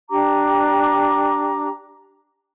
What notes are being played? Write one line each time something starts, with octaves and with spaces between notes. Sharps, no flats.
D4 G4 A#5 D6